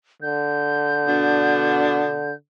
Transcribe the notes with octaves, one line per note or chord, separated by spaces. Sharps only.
D3 G6
B2 B3 D4